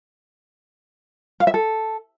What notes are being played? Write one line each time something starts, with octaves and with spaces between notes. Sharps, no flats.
F5
E5
A4